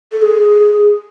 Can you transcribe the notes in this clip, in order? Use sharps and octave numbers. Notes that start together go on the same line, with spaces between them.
A4
G#4